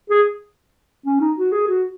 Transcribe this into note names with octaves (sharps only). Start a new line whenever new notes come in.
G#4
C#4
D#4
F#4
G#4
F#4